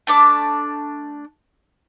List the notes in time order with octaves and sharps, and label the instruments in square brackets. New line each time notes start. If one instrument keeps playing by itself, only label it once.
[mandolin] A3 D4 D6